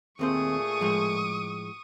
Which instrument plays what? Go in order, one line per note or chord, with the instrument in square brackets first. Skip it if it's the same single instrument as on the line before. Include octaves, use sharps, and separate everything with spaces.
[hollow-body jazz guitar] D#2 C4 C5 [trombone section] A#2 A3 G#4 [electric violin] C#6 D#6
[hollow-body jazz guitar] A2 F3 G#3